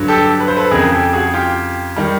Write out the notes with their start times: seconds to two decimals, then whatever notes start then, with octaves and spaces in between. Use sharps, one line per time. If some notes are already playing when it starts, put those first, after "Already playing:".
Already playing: G2 D3 F#3
0.08 G4 A4
0.40 B4
0.48 C5
0.57 A4 B4
0.71 F2 C#3 F3 G#4 A#4
0.92 G4 A4
1.13 F#4 G#4
1.34 F4 G4
1.96 D#3 G3